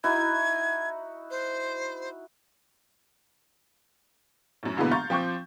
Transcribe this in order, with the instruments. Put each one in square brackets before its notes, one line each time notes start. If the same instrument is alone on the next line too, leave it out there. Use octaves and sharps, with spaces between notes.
[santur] D#4 E4 F#4 [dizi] G#6
[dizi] C5
[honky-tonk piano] F#2 A2
B2 D3 E3 G#3 A#3 B3
F5 A#5 C6 C#6 G6 A6
F3 C4 G5 C#6 D6 G6